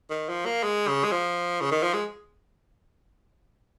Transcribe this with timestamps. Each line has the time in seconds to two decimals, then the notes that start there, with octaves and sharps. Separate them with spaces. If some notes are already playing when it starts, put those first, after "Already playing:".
0.10 D#3
0.29 F3
0.45 A#3
0.63 G#3
0.88 C#3
1.04 G#3
1.11 F3
1.61 C#3
1.71 D#3
1.83 F3
1.93 G#3